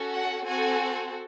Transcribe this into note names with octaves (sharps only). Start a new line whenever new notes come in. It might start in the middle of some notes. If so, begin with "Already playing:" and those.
Already playing: C#4 F#4 A4
F#5
C4 F#4 A4 G#5